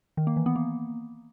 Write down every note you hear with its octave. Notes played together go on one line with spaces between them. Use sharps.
D#3
A#3
E3
B3
A#3